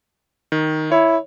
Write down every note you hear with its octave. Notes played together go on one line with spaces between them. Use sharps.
D#3
E4 C#5